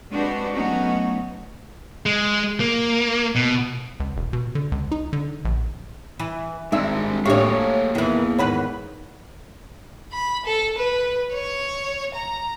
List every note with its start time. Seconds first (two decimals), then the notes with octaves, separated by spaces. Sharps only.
0.11 G#3 C4 D4 F#4 G4 B4
0.54 F#3 A3 B3 C#4 D#4 F#4
2.06 G#3
2.60 A#3
3.35 B2
4.00 C#2
4.17 E1
4.33 B2
4.55 D3
4.72 C#2
4.92 D#4
5.13 D3
5.45 A#1
6.19 E3
6.72 G#1 G2 G#3 C4 D#4 E5 E6
7.26 A2 A#3 D4 G4 G#4 C#5 F5 C#6
7.95 E2 D#3 E3
8.38 G#2 D#3 B4 C#5 F#5 B5
10.12 B5
10.46 A4
10.78 B4
11.33 C#5
12.14 A#5